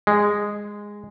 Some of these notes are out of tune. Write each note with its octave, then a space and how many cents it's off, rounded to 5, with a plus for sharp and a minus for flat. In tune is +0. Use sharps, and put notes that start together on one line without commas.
G#3 -10